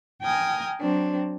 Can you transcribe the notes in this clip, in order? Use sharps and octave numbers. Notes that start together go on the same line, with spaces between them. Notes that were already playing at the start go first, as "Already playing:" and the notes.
G5 G#5 A#5 D#6 F6
F#3 C4 D4